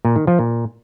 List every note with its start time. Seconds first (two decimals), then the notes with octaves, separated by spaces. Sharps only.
0.05 A#2
0.16 D#3
0.27 F3
0.39 A#2